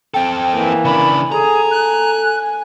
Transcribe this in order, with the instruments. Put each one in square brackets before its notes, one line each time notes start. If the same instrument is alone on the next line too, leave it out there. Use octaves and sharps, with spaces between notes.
[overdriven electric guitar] C4 A4 [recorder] G5
[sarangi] E3 [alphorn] A#3
[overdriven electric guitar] C#3 D4 [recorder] B5
[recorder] G#4 [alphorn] A4 [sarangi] G#5 [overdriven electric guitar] A#5
[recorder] F#6